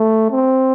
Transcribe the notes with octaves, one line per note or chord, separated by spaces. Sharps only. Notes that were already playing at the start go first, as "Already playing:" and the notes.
Already playing: A3
C4